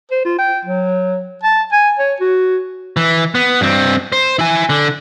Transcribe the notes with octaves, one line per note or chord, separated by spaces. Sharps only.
C5
F4
G5
F#3
A5
G#5
C#5
F#4
E3
B3
G2 C4
C5
E4 G#5
D3